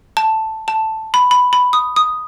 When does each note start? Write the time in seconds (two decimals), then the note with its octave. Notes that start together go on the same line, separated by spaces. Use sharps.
0.17 A5
0.68 A5
1.14 B5
1.31 B5
1.53 B5
1.73 D#6
1.96 D#6